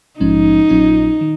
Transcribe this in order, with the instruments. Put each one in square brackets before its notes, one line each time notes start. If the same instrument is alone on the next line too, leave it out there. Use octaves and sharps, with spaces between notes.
[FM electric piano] A#1 G#2 F3 G#3 C#4 [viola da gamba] D#4
[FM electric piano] A#1 A#2 F#3 C#4 F4
D#3